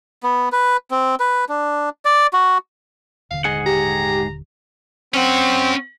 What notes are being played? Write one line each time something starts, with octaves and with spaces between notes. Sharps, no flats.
B3
B4
C4
B4
D4
D5
F#4
D#1 D3 F5
G#2 G#4 D#5 F#5
G4 A#5
C4 C#4 F#5